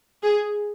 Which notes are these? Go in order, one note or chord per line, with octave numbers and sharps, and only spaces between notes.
G#4